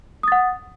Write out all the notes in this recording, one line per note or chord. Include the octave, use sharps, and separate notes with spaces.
F#5 D#6 A6